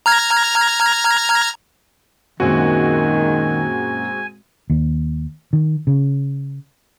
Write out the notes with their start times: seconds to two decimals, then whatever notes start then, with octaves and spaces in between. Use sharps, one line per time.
0.06 A#5 F6 G#6
2.40 F#2 A#2 D#3 G#3 C4 F#4 G#5
4.70 D#2
5.53 D#3
5.87 C#3